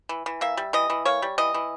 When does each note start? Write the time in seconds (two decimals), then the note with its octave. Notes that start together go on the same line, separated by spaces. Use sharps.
0.09 E3
0.26 E3
0.41 A#3 E5
0.57 G3
0.73 E3 D#5
0.90 E3
1.05 A#3 C#5
1.22 G3
1.38 E3 D#5
1.54 E3